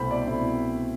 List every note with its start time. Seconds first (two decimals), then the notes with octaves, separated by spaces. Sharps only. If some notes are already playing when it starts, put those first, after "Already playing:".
Already playing: C2 B2 A3 C4 E4 C5 B5
0.11 D5
0.27 C2 B2 A3 C4 E4